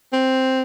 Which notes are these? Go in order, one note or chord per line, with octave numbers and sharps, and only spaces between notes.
C4